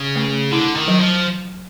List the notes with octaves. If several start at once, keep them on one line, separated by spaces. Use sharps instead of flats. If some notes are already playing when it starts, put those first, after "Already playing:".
Already playing: C#3
A3
D3 E4
D#3
F#3
F3